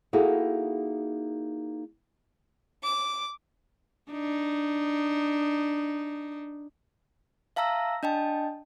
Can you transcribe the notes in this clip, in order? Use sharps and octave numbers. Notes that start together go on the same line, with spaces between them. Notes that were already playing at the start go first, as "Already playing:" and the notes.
A#3 D#4 E4 F#4 G#4 A4
D6
D4 D#4
E5 F5 A5 A#5 E6 A#6
D4 D#5 G5 A5